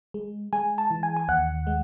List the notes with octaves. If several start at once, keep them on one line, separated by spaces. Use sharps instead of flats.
G#3
G#3 G#5
A5
E3
G#5
G#5
D#2 F#5
G#3